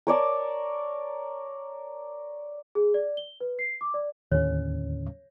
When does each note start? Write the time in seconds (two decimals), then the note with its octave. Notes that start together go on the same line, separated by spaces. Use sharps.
0.07 A#4 C#5 D5 A5
2.75 G#4
2.94 D5
3.17 G7
3.40 B4
3.59 C7
3.81 D6
3.94 D5
4.32 D#2 A2 D3 C#4 C#5